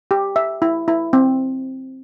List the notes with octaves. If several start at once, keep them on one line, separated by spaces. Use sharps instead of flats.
G4
E5
E4
E4
C4